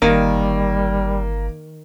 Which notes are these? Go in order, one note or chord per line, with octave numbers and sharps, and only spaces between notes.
G1 D#3 G3 A#3